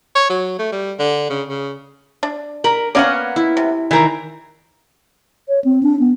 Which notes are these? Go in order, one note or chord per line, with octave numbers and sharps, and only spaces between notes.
C#5
F#3
A3
G3
D3
C#3
C#3
D4
A#4 B5
A#3 B3 C#4 D5 F5 F#5
E4
C3
D#3 E3 A#4 C5 A#5
C#5
C4
D4
B3